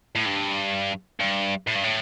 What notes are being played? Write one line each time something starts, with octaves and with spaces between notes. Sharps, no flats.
A2
G2
G2
A2
G2
A2